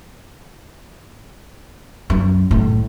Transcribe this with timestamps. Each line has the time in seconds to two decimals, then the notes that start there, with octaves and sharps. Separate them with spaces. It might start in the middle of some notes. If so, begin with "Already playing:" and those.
2.10 F#2
2.51 A2